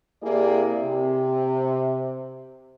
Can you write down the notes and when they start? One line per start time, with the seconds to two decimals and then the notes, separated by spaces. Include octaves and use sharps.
0.22 C3 A#3 E4 G4 G#4 D5
0.76 C3